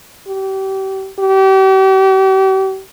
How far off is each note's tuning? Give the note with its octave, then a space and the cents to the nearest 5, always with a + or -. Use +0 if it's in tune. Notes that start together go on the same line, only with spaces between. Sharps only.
G4 -30
G4 -40